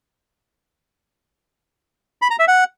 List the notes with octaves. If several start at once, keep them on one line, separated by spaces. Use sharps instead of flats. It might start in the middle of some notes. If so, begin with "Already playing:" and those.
B5
A#5
E5
F#5